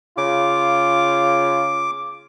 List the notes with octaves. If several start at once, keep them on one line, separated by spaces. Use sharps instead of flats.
C#3 F4 D6